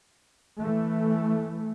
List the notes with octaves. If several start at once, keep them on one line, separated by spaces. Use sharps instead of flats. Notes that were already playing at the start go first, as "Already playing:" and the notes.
E3 A3